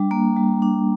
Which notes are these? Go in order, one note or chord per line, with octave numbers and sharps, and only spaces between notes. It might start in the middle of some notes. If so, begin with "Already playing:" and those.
Already playing: G3 D4
A#3
G3
D4